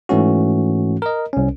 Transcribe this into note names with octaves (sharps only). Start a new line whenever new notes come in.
G#2 E3 A3 C#4 F#4
A#4 D#5
C2 C#4